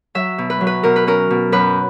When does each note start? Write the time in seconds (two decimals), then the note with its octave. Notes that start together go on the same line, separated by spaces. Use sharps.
0.15 F#3 E5
0.38 B2
0.50 B4
0.61 F#3
0.67 B4
0.83 B2 A#4
0.96 B4
1.07 C#4 A#4
1.30 B2
1.52 F#2 B4